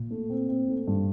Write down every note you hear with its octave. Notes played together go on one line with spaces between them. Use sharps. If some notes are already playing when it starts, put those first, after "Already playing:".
Already playing: A#2
A3
C4
C4
A3
G2